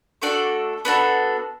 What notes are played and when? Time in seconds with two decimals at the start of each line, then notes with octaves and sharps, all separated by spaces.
0.22 A3 D4 F#4 A4 D5
0.85 B3 D4 F#4 A4